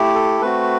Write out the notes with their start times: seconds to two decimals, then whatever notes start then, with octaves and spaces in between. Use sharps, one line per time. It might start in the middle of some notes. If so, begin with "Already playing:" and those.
Already playing: A3 E4 G4
0.15 A4
0.42 A3 C4 F#4 B4